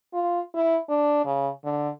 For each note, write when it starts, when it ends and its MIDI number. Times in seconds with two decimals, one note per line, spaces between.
0.13 0.40 65
0.55 0.78 64
0.89 1.24 62
1.25 1.49 49
1.64 1.89 50